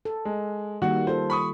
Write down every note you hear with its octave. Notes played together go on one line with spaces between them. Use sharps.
A4
G#3
D#3 G3 A#3 F#4 F#5
F4 A4 C5
B5 C#6 D#6